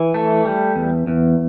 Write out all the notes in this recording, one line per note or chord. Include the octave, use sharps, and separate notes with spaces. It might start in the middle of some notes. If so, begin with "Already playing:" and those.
Already playing: E3
A3
G3
E2
E2